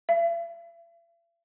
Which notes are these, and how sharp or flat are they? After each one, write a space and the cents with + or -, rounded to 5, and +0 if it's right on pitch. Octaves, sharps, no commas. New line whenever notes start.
E5 +45